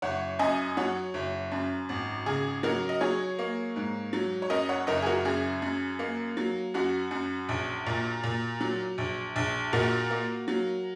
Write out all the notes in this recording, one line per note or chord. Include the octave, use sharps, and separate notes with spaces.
F#1 C#5 F#5
F#2 D#5 G#5
F#3 C#5 F#5
F#1
F#2
G#1
C#3 G#4
F#3 F#4 A#4
D#5
F#3 G#4 C#5
A#3
G#2
F#3
C#5
F#2 A#4 D#5
C#5 F#5
F#1 A#4 D#5
G#4
F#4 A#4
F#2 G#4
F#2
A#3
F#3
F#2 F#4
F#2
A#1
A#2
A#2
F#3
A#1
A#1
A#2 F#4 A#4
A#3
F#3